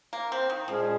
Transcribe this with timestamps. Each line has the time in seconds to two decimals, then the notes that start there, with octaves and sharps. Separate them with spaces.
0.13 A#3
0.32 C4
0.50 D#3
0.68 A#2 F3 G#3 C#4 G#4